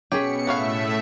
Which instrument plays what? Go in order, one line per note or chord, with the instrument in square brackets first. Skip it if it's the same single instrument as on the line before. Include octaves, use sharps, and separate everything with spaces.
[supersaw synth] B2 C#7 [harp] C#4 G#4 B6 [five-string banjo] G4
[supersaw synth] A2 A3 E5 [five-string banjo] B3 C#5 F5